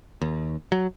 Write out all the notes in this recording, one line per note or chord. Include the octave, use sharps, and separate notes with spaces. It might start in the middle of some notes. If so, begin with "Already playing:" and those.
D#2
F#3